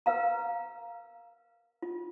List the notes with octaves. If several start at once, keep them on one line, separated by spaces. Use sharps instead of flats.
A#4 B4 F5 A#5
F4